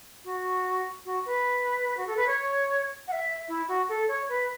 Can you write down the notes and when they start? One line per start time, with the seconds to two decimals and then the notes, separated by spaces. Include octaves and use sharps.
0.24 F#4
1.05 F#4
1.25 B4
1.97 F#4
2.07 A4
2.16 B4
2.26 C#5
3.07 F#5
3.12 E5
3.48 E4
3.68 F#4
3.88 A4
4.08 C#5
4.29 B4